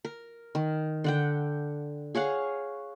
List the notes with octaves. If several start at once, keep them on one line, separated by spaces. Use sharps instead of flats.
A#4
D#3
D3 F#5 G5
G#4 C#5 F5 F#5